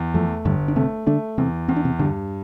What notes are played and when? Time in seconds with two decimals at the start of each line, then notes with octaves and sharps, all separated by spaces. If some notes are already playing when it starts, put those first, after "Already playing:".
Already playing: E2
0.14 F2 F3 A3
0.45 G1 G2 G3
0.68 D4
0.76 C3 A3 C4
1.06 D3 A3 D4
1.38 E2 C3 C4
1.68 E2 C4
1.76 D4
1.85 C3 C4
1.99 G2 D3 D4